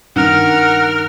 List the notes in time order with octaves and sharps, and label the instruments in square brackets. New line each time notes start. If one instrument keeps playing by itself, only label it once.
[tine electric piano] G2 [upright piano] D#3 [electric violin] A#4 F6 [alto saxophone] F#5